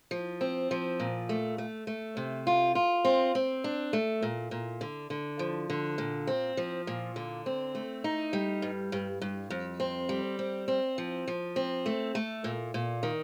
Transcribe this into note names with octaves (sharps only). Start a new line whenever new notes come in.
F3
C4
F3
A#2
A3
A3
A3
C3
F4
F4
C4
C4
D4
A3
A#2
A#2
D3
D3
F3
D3
A#2
C4
F3
A#2
D3
C4
A3
D#4
G3
G2
G2
G2
F2
C4
G3
C4
C4
F3
F3
C4
A3
A3
A#2
A#2
D#3